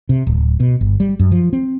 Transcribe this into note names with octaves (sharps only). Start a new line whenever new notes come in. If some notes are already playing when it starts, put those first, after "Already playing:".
C3
D1
B2
G1
G3
F#2
F3
C4